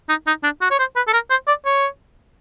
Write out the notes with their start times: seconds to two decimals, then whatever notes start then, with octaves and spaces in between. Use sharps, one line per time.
0.09 D#4
0.27 D#4
0.43 D4
0.61 F#4
0.71 C#5
0.79 C5
0.96 B4
1.07 A4
1.13 A#4
1.30 C5
1.48 D5
1.65 C#5